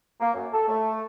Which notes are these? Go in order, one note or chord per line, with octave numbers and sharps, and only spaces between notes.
A#3
F#2
A4
A3